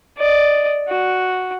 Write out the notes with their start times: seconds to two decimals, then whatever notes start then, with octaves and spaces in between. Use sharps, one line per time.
0.18 D5 D#5
0.89 F#4